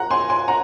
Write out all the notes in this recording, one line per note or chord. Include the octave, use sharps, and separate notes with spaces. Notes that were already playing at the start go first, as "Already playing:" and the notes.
Already playing: F#5 A#5
G#5 C6
G#5 C6
F#5 A#5